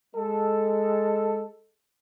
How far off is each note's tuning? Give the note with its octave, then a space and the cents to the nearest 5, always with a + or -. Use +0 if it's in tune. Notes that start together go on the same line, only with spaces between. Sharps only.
G#3 +0 A4 +0